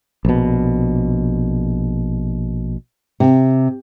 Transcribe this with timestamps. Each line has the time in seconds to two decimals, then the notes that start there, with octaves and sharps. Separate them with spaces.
0.25 A#1 B2
3.20 C3